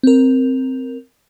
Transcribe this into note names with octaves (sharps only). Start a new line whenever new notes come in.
C4 A#4